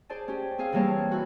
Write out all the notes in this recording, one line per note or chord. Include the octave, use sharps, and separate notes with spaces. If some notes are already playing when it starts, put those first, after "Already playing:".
G#4 C5 D5 A5
C#4 G4
C4 G#4 F5
C3 E3 G3 A#3 C#5 A5
E4 F#4